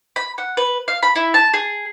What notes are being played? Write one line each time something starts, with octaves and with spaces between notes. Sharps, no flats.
B5
F#5
B4
F5
B5
E4
A5
G#4